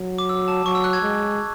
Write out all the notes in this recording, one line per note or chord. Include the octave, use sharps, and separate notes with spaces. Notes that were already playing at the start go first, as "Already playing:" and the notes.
Already playing: F#3
D6
E6
A5
F#3 C#6
E6
F#6
G#6
G#3